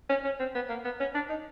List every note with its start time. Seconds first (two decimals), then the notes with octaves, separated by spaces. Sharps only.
0.09 C#4
0.24 C#4
0.40 C4
0.55 B3
0.69 A#3
0.85 B3
1.00 C#4
1.15 D4
1.30 D#4